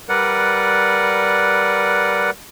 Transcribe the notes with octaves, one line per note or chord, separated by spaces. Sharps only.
G3 A#4 B4 D5 F#5